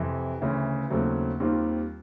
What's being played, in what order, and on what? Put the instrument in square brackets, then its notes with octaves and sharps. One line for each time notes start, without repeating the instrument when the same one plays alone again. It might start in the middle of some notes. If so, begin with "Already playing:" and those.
Already playing: [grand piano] F2 C3 E3
D2 C#3 E3
D#2 C#3 F#3 A3 C4
D#2 D#3 G3 C4 F4